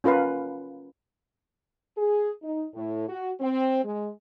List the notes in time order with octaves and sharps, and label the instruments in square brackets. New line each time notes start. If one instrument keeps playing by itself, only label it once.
[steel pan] C#4 F4 A#4 B4 F5
[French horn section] G#4
D#4
A2
F#4
C4
G#3